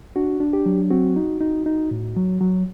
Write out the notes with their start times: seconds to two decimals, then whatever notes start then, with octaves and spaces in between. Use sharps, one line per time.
0.16 D4 F#4
0.40 D4
0.53 G4
0.66 F#3
0.91 C4 F#4
1.16 D#4
1.40 D#4
1.66 D#4
1.91 A2
2.16 F#3
2.41 F#3